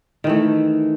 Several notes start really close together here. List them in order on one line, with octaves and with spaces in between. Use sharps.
D#3 E3 A3